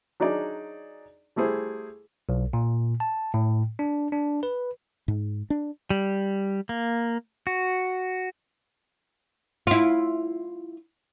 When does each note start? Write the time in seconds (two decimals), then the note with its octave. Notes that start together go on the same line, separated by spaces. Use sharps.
0.20 F#3 D4 D#4 G#4 D5
1.36 G3 A3 E4 G#4 C5
2.29 B1
2.53 A#2
3.00 A5
3.34 A2
3.79 D4
4.12 D4
4.43 B4
5.08 G#2
5.50 D4
5.90 G3
6.69 A#3
7.47 F#4
9.67 E4 F4